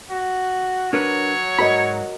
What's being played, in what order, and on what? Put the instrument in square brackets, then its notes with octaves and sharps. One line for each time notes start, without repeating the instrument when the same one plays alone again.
[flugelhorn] F#4
[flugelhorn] F#3 [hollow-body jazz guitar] D4 A#4 B4 [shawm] C#5
[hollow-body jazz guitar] G#2 B5 [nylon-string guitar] F#4 A#4 D#5